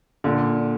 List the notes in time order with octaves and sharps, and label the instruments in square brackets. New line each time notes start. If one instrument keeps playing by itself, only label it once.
[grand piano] A#2 D3